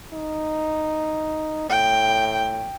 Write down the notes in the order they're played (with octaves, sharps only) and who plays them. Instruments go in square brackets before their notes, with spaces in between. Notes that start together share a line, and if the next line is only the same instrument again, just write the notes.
[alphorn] D#4
[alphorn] A2 [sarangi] G5